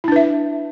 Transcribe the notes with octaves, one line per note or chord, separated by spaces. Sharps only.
D4 E4 B4 E5